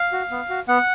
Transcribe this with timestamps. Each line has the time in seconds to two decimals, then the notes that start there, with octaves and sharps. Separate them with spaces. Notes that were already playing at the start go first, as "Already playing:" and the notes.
Already playing: F5
0.12 F#4
0.31 B3
0.50 F#4
0.68 B3 F#5